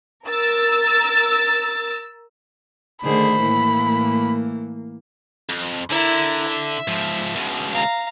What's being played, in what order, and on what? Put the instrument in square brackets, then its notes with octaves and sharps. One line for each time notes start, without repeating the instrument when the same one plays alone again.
[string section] A#4 E6 A6
[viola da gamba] D3 G#4 C5 [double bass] D#3 A3 [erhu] B5
[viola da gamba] A2 E3 [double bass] A#3
[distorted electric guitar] F2
[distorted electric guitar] D3 [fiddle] E4 A#4
[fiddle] E5
[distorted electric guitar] G#2 F3
C#2 B2
[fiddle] F5 A#5